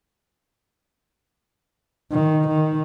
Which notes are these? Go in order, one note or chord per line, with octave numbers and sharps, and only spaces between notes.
D#3
D#3